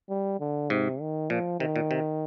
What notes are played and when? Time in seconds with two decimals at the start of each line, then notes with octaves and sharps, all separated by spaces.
0.09 G3
0.40 D3
0.70 G#2 C3
1.01 D#3
1.30 A#2 F3
1.60 C3 D#3
1.76 A#2
1.91 C3